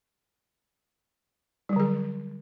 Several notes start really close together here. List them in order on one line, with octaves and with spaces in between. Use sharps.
G3 F#3 D3 G#4